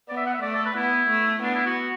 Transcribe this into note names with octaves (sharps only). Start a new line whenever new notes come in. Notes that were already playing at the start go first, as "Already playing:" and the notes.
B3 D5
E5
F#5
E5
A3 D5
A4
B4
B3 E4
A3
B3 D4
E4
F#4